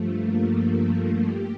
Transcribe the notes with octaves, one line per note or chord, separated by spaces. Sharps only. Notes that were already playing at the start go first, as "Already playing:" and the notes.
Already playing: G2 F3 A3
A#3
A#3
A3
G4